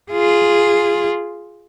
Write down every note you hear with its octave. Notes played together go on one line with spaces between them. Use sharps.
F4 G#4